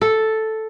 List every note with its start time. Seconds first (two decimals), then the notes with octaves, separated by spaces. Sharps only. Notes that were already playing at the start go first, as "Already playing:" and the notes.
0.02 A4